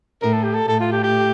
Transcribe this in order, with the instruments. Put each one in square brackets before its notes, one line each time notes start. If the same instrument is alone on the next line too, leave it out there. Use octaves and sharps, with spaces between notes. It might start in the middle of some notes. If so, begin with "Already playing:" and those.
[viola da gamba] A2 [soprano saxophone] A#4
[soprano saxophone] A4
G4
A4
[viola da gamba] A2 [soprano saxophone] A4
[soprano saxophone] F4
G4
G4